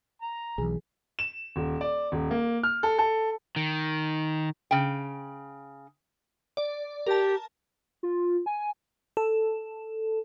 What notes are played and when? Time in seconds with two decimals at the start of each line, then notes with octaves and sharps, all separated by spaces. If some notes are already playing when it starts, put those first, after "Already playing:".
0.22 A#5
0.58 B1 E3 G#4
1.19 E7
1.56 D#1
1.81 D5
2.12 D#1
2.31 A#3
2.63 F6
2.83 A4
2.98 A4
3.56 D#3
4.71 C#3 G5
6.57 D5
7.06 G4 A#4 A5
8.03 F4
8.46 G#5
9.17 A4